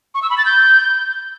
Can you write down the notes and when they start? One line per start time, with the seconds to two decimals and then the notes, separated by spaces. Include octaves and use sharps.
0.15 C#6
0.22 E6
0.30 B5
0.38 A6
0.45 G6